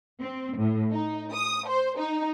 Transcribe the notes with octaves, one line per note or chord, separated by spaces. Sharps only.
C4
A2
D#4
D#6
C5
D#4